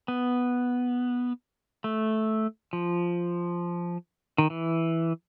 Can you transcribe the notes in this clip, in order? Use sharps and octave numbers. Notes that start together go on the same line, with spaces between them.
B3
A3
F3
D#3
E3